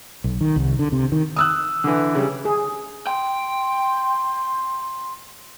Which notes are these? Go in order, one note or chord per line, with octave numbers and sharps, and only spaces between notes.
B1
D#3
C2
D3
C3
D#3
D#6 E6 F#6
D3 E3
C#3 G3
G#4
G5 C6